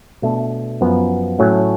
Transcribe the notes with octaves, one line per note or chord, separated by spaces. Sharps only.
B2 A3 D4
F#2 F3 B3
A2 F#3 A3 C#4